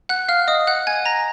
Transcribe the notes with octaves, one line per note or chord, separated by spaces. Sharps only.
F#5 F#6
F5 F6
D#5 D#6
F#5 F#6
G#5 G#6
A#5 A#6